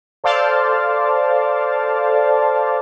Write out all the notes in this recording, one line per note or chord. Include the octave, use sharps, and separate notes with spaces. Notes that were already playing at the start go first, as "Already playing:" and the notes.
A4 C5 D5 F5 A5